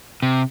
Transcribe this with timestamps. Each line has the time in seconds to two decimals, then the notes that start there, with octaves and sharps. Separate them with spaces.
0.23 C3